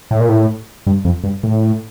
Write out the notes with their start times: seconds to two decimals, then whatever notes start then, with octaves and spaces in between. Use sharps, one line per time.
0.11 A2
0.20 A#2
0.29 A2
0.87 G2
1.05 F2
1.24 G2
1.43 A2